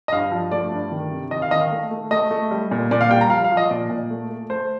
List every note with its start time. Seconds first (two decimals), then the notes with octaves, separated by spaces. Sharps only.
0.08 D#5
0.12 G2 F5
0.32 F3
0.51 A3 D5
0.71 G2
0.92 D#3
1.11 C3
1.31 D#3 D#5
1.42 F5
1.51 D#3 D#5
1.61 F5
1.71 A3
1.91 A3
2.11 A3 D#5
2.31 A3
2.51 G3
2.71 A#2
2.91 A#2 D5
3.01 F5
3.10 G3 G5
3.21 A#5
3.30 F3 F5
3.44 F5
3.51 F3
3.57 D#5
3.70 A#2 D5
3.90 A#2
4.11 A3
4.30 A3
4.50 A3 C5